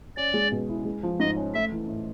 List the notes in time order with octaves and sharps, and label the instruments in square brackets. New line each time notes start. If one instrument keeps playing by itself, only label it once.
[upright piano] C#4 [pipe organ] D5
[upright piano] G#3
B2
E4
G#3
F3
[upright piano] G#2 [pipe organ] D#5
[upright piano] C#4
[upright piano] A3 [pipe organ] E5
[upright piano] E3
A2